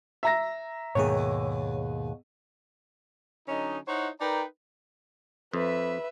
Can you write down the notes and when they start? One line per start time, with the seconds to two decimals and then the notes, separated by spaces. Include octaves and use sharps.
0.23 E5 A#5 A#6
0.95 D#2 G#2 B2 G#4 C#5
3.48 D3 F#3 C#4 D#4
3.87 D#4 E4 C5 C#5 D#5 F#5
4.20 D#4 A#4 B4 D5 G5 A#5
5.53 F2 B4 E5